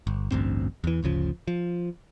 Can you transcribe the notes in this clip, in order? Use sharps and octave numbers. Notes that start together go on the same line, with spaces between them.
G1
A1 D2 G2 C4
E2 E3
G1 D2 C#3 F3
F3